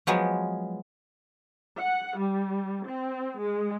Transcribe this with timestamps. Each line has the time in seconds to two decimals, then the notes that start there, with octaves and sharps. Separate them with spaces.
0.07 F3 F#3 G#3 B3
1.78 F#5
2.18 G3
2.86 C4
3.40 G#3